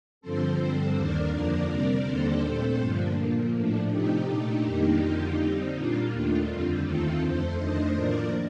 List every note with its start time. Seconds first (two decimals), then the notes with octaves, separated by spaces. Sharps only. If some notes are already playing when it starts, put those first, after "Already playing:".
0.21 G2 D3 F3 C4 A4 C5
0.59 G2 D3 G3 C4
0.95 D#2 D#3 A#3 D4 A#4 D5
1.31 F2 D3 F3 A#3 D4 A#4 D5
1.68 C3 G3 C4 A#4 D5
2.05 D#2 D3 G3 A#3 D4 A4 C5
2.43 A#2 A3 C4
2.79 G2 D3 F3 A#3 D4
3.16 A#2 F3 A#3
3.54 A2 F3 A3 D4
3.89 C3 F3 A3 D#4 G4
4.27 A#2 A3 D4
4.64 F2 D#3 G3 A#3 D4
5.00 F2 D3 F3 A#3
5.37 D3 G3 C4 D#4
5.74 A#2 G3 A#3 D4 F4
6.10 D#2 D#3 A3 D4
6.48 F2 D3 G3 C4
6.84 D#2 D#3 A3 C4 F4 A4
7.21 F2 D3 A3 A4 C5
7.58 F2 D#3 A3 D4 C5 D#5
7.95 A2 F3 A#3 D4 A#4 D5